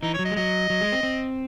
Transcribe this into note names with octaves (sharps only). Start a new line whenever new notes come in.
E3 D#4
C#5
F#3
D#5
G#3
F#3 D#5
F#3
G#3
C4
C4